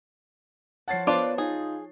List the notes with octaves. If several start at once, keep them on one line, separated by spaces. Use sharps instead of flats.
F3 C#5 F#5 A5 A6 C7
B3 D4 F4 C5 D5 F#6
D#4 F4 G#4